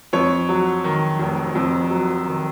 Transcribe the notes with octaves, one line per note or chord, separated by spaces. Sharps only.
F2 C#5
F#3
D#3
F1
F2
F#3
D#3